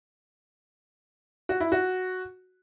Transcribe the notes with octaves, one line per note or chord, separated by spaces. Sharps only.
F#4
E4
F#4